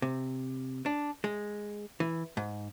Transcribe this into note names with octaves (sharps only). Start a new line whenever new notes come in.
C3
D4
G#3
E3
G#2